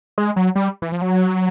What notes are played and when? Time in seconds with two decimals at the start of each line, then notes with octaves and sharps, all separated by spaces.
0.18 G#3
0.36 F#3
0.55 G3
0.82 E3
0.92 F3
1.02 F#3